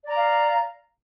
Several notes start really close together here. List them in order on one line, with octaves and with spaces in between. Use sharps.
D5 A#5 F5